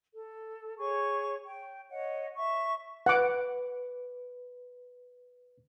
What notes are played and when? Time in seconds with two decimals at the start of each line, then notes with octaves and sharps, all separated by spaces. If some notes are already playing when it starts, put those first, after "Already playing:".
0.14 A4
0.79 G#4 C#5 C#6
1.45 G5
1.90 C#5 D#5 F#5
2.35 E5 C#6
3.06 B4 F#5 D6